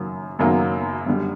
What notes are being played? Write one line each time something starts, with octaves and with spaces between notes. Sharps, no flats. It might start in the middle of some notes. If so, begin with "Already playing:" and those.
Already playing: F#1 F#2 D#3 F#3 A#3
F#1 F#2 D#3 F#3 A#3
F#2 D3 G3